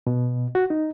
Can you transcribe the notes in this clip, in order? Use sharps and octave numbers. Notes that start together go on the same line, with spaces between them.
B2
F#4
D#4